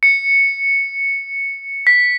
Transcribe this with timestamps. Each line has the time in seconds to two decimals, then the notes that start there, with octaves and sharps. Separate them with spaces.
0.03 C#7
1.87 B6